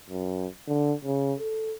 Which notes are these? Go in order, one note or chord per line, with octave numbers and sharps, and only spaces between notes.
F#2
D3
C#3
A4